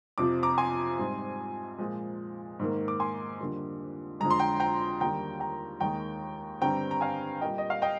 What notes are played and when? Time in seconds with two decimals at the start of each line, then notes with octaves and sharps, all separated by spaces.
0.18 F2 C3 F3 D6
0.43 A#5 D6
0.58 G#5 C6
0.98 G#2 G3 C4
1.79 A#2 F3 G#3
2.60 G#2 D#3 A#3
2.88 D6
3.00 G#5 C6
3.40 F2 D3 G3 A#3
4.20 F2 D3 G#3 A#5
4.30 C6
4.39 G5 A#5
4.60 G5 A#5
5.00 D#2 D3 G3 A#3 G5 A#5
5.40 G5 A#5
5.80 D#2 D#3 G#3 G5 A#5
6.61 G2 D3 G3 C4 G5 A#5
6.91 A#5
7.01 F5 G#5
7.41 A#2 G3 A#3 D#5 G5
7.58 D#5
7.70 F5
7.82 D#5 G5